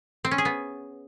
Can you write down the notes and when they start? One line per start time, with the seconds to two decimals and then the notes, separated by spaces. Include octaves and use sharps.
0.25 C4
0.31 C#4
0.38 G#4
0.45 B3